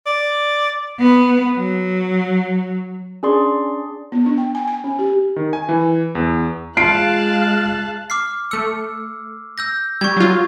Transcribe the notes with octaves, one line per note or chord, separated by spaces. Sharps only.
D5
B3
F#3
C#4 D4 G#4 D5 C6
B3
D4
G5
G#5
G#5
C#4
G4
D#3
G#5
E3
E2
G#3 F4 F5 A5 F#6 C7 D7
D6 F6 C7
A3 E6 C#7
E6 G6 A#6
G3 C#6 G#6
F#3 F4